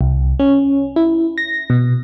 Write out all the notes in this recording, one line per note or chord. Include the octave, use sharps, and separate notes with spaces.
C2
C#4
E4
A#6
B2